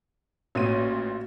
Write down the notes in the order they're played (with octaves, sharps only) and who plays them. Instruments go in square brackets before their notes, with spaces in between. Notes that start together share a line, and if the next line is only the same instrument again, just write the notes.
[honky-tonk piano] A1 A#2 D#7 [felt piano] F#4 C#5